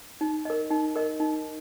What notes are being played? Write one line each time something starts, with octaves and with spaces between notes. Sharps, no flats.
D#4
A#4 D#5
D#4
A#4 D#5
D#4